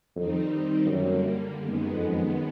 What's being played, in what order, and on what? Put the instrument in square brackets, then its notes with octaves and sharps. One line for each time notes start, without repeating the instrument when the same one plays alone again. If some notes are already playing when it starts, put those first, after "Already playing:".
[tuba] F2 [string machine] D#3 G3 C4 D#4
[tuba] F#2 [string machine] D3 G3 A#3
[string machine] F#2 D#3 G#3 B3
[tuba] F2